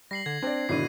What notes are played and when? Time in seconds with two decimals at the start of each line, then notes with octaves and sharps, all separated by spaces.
0.11 G3 A#6 C7 F#7
0.26 D3 G#6
0.42 C4 D4 D5
0.69 G#1 B2 D3 E4 C7 D#7